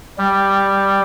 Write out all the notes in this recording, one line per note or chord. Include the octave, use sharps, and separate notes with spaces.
G3